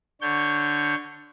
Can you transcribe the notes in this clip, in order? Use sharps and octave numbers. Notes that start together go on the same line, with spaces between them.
D3 C#5 G6